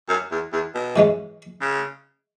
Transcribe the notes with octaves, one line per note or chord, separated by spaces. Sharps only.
F#2
E2
E2
B2
G#2 E3 G#3 C#4
C#3